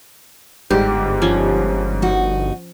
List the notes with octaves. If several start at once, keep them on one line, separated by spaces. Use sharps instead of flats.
G1 G#2 G3 G4
F3 C#4
D#4 F#4